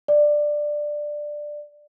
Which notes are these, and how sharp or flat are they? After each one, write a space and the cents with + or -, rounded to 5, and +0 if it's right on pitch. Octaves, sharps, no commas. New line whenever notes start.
D5 +10